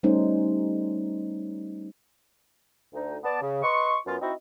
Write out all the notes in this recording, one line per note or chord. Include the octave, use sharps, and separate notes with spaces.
G3 A3 C#4 D#4 C5
D2 D#4
B3 D5 A5
C#3
B4 D#5 C6 C#6
F#2 B3 C#4 F4
C4 D#4 E4 F#4 C5 D#5